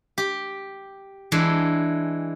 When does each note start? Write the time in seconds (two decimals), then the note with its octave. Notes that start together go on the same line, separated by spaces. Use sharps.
0.18 G4
1.32 E3 G#3 D4